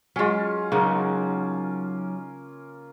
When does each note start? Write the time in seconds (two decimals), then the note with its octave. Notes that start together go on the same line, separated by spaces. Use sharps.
0.16 F#3 G#3 C#4 F4
0.72 C#3 F#3 A#3 D#4 F#4